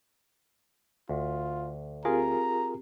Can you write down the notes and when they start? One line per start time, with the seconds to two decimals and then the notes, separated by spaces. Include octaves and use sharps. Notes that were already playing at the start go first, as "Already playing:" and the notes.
1.09 D2 F4
2.05 C4 F4 G4 G#4 A#4 A#5